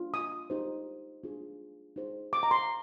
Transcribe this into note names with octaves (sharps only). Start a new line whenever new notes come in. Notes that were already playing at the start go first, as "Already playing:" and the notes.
Already playing: D4 F4
D#6
D#4 G4 C5
D4 F4 G#4
D#4 G#4 C5
D6
A#5
C6